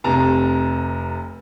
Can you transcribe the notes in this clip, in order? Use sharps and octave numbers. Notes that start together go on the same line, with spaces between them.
F1 C3 A5 A#5